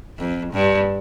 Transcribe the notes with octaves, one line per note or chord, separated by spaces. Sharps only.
F2
G2